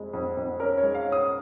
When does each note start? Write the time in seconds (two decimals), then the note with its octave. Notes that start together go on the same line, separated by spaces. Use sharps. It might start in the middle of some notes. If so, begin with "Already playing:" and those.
Already playing: F2 G#3
0.13 F2
0.37 F2
0.59 C#4 A#4
0.78 C#5
0.83 G#3
0.95 F5
1.07 C#4
1.12 D#6